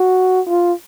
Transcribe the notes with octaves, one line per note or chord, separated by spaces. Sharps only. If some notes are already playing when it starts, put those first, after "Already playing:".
Already playing: F#4
F4